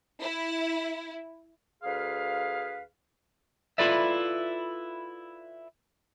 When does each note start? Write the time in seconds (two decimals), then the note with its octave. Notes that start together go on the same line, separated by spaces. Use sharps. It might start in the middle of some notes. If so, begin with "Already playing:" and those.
0.22 E4
1.83 D2 G#4 B4 F5
3.78 E4 F4 A4 B4 D5 E5